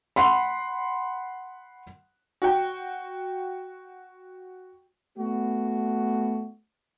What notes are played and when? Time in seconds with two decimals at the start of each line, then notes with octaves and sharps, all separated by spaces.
0.16 F#5 B5 C6
2.42 F#4 G5
5.16 A3 B3 F#4